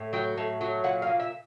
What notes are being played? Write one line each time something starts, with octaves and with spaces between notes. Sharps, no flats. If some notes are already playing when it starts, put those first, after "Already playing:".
Already playing: A2
F#3 G5
A2
F#3
A#2 F#5
F5
A#2
E5